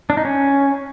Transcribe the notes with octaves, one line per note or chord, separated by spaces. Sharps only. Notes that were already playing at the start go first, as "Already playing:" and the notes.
D4
D#4
C#4